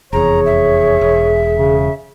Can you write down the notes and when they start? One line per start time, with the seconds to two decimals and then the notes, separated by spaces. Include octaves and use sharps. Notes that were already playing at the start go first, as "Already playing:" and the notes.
0.13 F1 E2 G#4 C#5 A#5
0.46 E5
1.01 E1
1.56 C#3